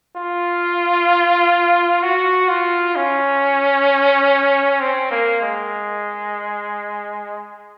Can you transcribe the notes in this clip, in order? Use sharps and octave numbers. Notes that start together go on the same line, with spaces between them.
F4
F#4
F4
C#4
C4
A#3
G#3